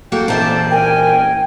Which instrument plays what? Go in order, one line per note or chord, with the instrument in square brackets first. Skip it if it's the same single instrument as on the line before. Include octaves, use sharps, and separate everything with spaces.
[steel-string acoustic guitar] A#3 F#4 A4 [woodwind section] G5
[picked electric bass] A#2 E3 [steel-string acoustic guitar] A#3 C5 D5 [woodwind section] A4 E5 A5
[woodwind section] A#4 G#5 [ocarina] G5